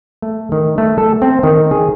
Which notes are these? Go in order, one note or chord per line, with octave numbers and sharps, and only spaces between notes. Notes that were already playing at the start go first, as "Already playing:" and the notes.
A3
D#3
A3
A4
C4
D#3
G#4